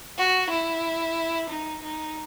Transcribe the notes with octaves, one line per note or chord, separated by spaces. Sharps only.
F#4
E4
D#4
D#4